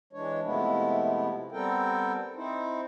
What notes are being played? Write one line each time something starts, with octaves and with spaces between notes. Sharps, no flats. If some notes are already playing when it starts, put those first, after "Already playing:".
E3 G#3 D4 C#5
C3 F3 G#3 A3 B3 E4
G3 B3 C4 A4 A#4 G5
C4 D#4 E4 C5